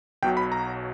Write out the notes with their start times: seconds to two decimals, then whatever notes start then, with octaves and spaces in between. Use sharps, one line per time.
0.23 B1 B2 F#3 G5
0.37 B5
0.52 A#5